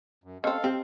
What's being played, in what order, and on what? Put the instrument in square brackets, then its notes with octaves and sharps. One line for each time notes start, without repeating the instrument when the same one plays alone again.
[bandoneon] F#2
[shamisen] C4 C#4 [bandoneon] A4 F5 [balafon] D#5
[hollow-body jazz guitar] C4 [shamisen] G4